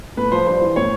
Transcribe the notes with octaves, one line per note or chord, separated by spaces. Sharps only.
A2 B4
F3 C5
G2 C5
E3
A2 C#5